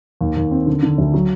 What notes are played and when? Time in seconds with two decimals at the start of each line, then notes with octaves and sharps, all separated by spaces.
0.21 D#2
0.37 D#2
0.51 C4
0.67 D3
0.83 D3
0.98 D2
1.14 F#3